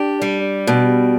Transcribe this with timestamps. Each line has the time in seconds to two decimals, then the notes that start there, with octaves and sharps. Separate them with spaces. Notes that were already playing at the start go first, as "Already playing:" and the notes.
Already playing: D4 G4
0.22 G3
0.67 B2